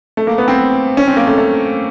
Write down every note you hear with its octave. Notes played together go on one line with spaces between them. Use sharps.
A3
A#3
B3
C4
C#4
C4
A#3
A3
A3